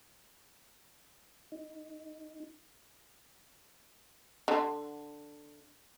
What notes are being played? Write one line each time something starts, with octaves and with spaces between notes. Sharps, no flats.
D#4
D3